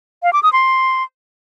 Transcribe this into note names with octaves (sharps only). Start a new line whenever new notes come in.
F5
D6
D#6
C6